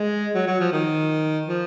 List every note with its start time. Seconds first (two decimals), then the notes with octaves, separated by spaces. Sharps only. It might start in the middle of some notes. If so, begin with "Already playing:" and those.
Already playing: G#3
0.35 F#3
0.47 F#3
0.60 F3
0.72 D#3
1.47 F3